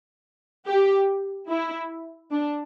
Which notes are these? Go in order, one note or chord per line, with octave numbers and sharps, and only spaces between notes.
G4
E4
D4